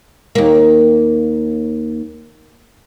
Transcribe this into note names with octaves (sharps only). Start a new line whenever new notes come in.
D#2 A#3